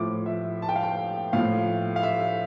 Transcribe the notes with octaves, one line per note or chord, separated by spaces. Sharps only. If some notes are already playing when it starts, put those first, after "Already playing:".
Already playing: A2 F3 D6
E5
A5
G5
F5
G5
A2 F3 F5
F5
E5